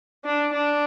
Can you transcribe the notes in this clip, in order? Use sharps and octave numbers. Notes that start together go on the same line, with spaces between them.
D4
D4